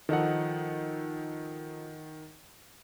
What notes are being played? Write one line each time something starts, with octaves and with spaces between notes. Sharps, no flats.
D#3 F3 D#4 A4 F#5